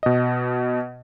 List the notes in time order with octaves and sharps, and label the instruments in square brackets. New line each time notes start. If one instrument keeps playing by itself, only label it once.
[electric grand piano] B2 D#5